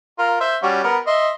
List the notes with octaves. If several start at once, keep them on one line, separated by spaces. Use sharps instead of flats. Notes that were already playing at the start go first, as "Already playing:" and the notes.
F4 A#4
C5 E5
G3 C#4 F#4
B3 A#4
D#5 E5 C6